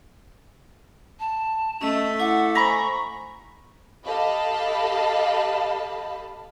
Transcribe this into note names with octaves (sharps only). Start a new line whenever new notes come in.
A5
A3 C#4 D#5
E4 F#5 D6
C5 G#5 A#5 B5 C#6
G4 A4 D#5 F5 A5 B5